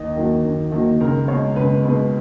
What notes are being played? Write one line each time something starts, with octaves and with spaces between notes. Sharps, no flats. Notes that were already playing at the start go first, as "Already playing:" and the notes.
Already playing: D#2 D#5
D#3 F#3 A#3
D#2
D#3 F#3 A#3
C#2 A#4
B2 G#3 C#5
C#2 B4
B2 G#3 B4